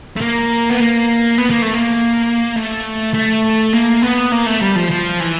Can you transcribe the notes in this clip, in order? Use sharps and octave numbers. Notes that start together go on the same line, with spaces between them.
A3
A#3
B3
A#3
B3
A#3
A3
A#3
A3
A3
A#3
B3
A#3
A3
G3
F3
F3
E3